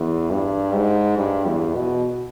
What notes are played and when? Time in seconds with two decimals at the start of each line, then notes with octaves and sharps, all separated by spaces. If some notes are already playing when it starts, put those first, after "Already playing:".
Already playing: E2
0.31 G2
0.74 G#2
1.17 G2
1.46 E2
1.75 B2